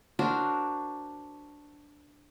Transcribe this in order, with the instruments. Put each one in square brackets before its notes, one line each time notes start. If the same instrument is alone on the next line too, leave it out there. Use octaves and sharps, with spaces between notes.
[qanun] D4 F#4 A#4 C5